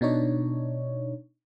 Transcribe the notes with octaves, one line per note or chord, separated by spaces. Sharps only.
B2 D4 D#4 C#5